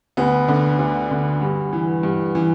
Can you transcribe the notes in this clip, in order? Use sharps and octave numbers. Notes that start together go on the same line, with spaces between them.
D2 B3
D3
D2
D3
G2
E3
G2
E3